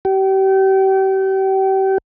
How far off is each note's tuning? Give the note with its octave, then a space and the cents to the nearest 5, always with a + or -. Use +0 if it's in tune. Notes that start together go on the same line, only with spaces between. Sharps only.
G4 -35